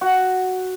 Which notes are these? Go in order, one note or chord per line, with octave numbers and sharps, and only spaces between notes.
F#4